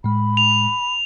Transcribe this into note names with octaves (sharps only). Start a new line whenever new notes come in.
A2 G#3 B5
F7